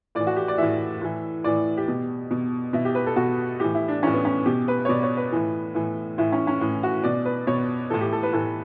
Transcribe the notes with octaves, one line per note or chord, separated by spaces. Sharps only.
A2 E3 D5
F#4
G4
D5
A2 E3 E5
A2 E3
A2 E3 D5
G4
B2
B2
B2 E4
G4
B4
A4
B2 F#4
A2 E3 G4
E4
D4
A2 E3 C#4
B3
C#4
B2 G4
B4
C#5
B2 D5
C#5
B4
A2 E3
A2 E3
A2 E3 E4
C#4
C#4
A2 E3
F#4
B2 D5
B4
B2 C#5
A2 E3 A4
G4
A4
B4
A2 E3 A4